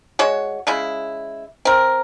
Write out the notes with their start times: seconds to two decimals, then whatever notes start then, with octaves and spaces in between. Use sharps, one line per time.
0.19 G#3 F#4 C#5
0.67 C#3 G#3 E4
1.65 C4 A#4